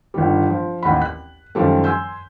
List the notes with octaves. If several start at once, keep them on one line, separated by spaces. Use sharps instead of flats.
G1 D#3 G3
F3
A1 D#2 F#5 B5
F#6
F#2 D#3 F3 G3 A3
G#5 C6 E6 G6